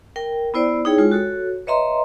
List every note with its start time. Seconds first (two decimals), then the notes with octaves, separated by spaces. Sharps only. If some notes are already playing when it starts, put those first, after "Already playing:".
0.16 A#4 G5
0.54 B3 E4 C5 D5
0.85 D#4 E4 G#4 C#5 G5
0.98 G#3 F4
1.12 F#4 A4 C#5
1.67 B4 C#5 D#5 E5 A#5 C6